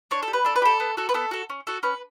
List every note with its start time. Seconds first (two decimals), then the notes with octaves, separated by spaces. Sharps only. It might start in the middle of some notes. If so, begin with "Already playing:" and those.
0.11 D4 C#5
0.23 A4
0.28 G4
0.33 B4
0.45 D4 A4
0.56 B4
0.62 G4 A4
0.80 B3
0.97 F#4 A4
1.09 B4
1.14 B3 A4
1.31 F#4 A4
1.50 C#4
1.67 F#4 A4
1.83 C#4 B4